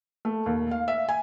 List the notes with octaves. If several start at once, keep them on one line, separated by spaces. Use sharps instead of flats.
A3
D#2
F5
E5
G#5